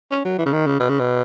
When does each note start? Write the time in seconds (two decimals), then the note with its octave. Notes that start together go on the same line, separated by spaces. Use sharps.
0.11 C#4
0.25 F#3
0.38 E3
0.46 C#3
0.53 D#3
0.66 C#3
0.80 B2
0.89 C#3
0.99 B2